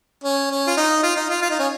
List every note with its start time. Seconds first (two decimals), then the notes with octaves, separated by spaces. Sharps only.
0.24 C#4
0.51 C#4
0.67 F4
0.77 D#4
1.03 F4
1.16 D#4
1.30 F4
1.42 F4
1.51 D#4
1.59 C#4